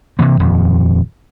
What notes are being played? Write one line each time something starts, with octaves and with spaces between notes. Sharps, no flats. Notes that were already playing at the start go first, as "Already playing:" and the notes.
C3 E3 A#3
D#1 F2